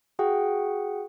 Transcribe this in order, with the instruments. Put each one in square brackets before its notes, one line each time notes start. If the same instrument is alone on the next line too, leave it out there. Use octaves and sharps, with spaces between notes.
[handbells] F#4 G#4 F#5 G5